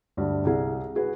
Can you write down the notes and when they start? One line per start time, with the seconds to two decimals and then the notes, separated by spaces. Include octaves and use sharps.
0.17 D2 G2
0.45 C2 G#4
0.95 F#4 G#4 B4